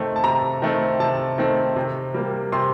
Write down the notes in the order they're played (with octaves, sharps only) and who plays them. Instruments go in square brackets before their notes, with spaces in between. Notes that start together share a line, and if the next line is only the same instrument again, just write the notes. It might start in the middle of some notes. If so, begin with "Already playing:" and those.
Already playing: [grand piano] C3 D#3 A3 C4
A5
C3 A#5
D#3 A3 C4
C3 A5
D#3 A3 C4
C3
G3 A#3
C3 C6